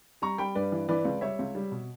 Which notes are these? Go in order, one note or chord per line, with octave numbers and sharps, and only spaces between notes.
G3 A#5 C#6
G3 G5 B5
G2 B4 D5
E3
E3 B4 D5
C#2
G3 C#5 E5
C#2
G3
B2